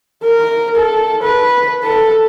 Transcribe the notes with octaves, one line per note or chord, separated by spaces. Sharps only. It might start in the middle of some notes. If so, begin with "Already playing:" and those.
A#4
A4
B4
A4